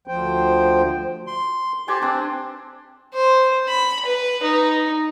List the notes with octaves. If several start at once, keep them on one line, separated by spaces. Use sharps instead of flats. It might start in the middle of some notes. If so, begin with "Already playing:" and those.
D2 F3 C5 G5
C6
G4 C5 D5 G#5
C4 D4 C5
C5
B5
B4
D#4